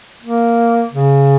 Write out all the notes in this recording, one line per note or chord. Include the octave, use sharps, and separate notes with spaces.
A#3
C#3